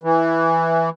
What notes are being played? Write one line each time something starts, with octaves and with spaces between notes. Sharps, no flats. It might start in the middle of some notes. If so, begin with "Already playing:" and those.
E3